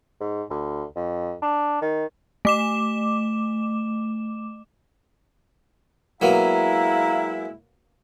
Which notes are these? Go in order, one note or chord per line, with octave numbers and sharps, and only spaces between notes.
G#2
D2
F2
D4
D#3
A3 D6 E7
F#3 G#3 A#3 B3 E4 F5 A#5